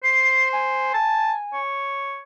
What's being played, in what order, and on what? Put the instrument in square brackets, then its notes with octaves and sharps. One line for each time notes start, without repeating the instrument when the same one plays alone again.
[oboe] C5 [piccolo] C7
[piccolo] G#5
[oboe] A5
C#5